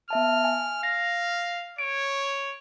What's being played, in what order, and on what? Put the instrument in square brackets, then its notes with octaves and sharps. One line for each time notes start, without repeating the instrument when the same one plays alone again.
[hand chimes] B3 E5 A5 [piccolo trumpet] F6
[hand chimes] G#5
[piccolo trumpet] F5 [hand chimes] A#6
[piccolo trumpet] C#5 [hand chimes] D7